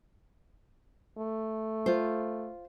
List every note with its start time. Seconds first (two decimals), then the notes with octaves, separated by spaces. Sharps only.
1.18 A3
1.86 F4 C5